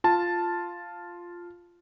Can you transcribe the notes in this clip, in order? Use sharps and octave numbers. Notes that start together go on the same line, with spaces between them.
F4 A5